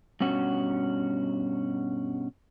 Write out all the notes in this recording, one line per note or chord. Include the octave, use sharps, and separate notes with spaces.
G2 B2 C#4 F#4